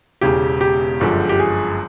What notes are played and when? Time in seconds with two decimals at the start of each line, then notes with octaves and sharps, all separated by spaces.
0.21 E1 E2 C#3 G4
0.61 G4
1.00 G1 F#2 D3 F3 G#3
1.29 G4
1.39 G#4